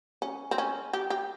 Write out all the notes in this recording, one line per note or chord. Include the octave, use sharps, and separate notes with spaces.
C#4
C4
C#4
G4
G4